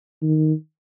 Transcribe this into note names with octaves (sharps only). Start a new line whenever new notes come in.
D#3